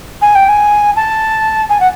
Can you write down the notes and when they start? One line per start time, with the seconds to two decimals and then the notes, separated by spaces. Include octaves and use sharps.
0.22 G#5
0.35 G5
0.49 G#5
0.96 A5
1.70 G#5
1.80 F#5